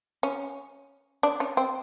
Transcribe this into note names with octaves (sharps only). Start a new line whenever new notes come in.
C#4
D4
C#4
C4